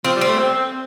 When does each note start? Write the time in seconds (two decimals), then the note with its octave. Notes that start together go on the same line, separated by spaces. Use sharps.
0.05 F3 C4
0.16 G3
0.21 C4
0.27 A3
0.38 C4
0.55 C4